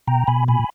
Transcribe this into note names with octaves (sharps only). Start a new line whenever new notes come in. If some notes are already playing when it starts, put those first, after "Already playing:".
B2 G5 A#5
B2 G#5 B5
A#2 G#5 B5